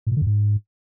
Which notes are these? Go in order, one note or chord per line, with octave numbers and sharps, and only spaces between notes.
A2
A#2
D3
F#2
G#2